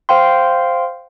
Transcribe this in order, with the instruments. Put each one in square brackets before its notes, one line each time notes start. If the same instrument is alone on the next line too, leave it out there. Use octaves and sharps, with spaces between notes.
[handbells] C5 F5 G5 C6